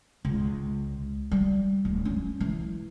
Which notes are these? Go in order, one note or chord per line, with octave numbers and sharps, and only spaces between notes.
C#2
G3
D1
C#4
E3